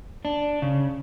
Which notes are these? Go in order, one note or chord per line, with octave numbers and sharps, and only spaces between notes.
D4
C#3